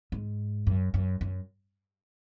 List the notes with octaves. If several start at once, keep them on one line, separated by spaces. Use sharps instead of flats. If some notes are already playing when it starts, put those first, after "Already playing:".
G#2
F#2
F#2
F#2